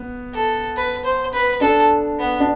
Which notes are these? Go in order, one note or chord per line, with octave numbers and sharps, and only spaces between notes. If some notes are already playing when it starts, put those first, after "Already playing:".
Already playing: B3
A4
B4
C5
B4
D4 A4
B3
D4